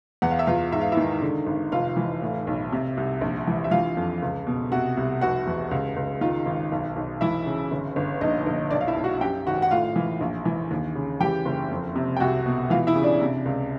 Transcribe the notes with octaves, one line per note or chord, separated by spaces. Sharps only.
E2 F#5
F5
E5
E2 F4 F5
G#2 E5
F5
E4 E5
D#3
D3
G#1
F1 F4 F5
E3
A2
B1
C3
C2
A#1
E3
E5
E3 F4 F5
F2
C#2
B2
C3 F#4 F#5
C2
F1 F#4 F#5
E2
C#2
C#2
D#3 F4 F5
G#1
B1
B1
E3 E4 E5
C#3
G1
G1
A#1 D#4 D#5
A#1
B1 D4 D5
F5
E4 E5
B1
F#4 F#5
F#2 G4 G5
G#1 F#4 F#5
F#5
A2 F4 F5
E3
A#1
E3
D#2
C#3
E3 G4 G5
F#1
F2
C3
G5
C2 F#4 F#5
B2
E3 F4 F5
E4 E5
C#3
D4 D5
C3
C#2